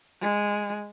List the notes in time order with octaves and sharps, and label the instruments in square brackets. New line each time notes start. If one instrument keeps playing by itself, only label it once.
[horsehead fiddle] G#3